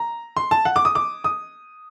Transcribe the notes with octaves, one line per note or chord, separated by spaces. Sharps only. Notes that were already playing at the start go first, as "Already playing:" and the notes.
Already playing: A#5
C6
A5
F#5
D6
D#6
D6
D#6